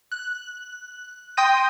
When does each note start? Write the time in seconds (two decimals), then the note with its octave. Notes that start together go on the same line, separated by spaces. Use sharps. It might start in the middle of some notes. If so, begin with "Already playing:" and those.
0.12 F#6
1.37 G5 C6 D#6 G6 A#6 D#7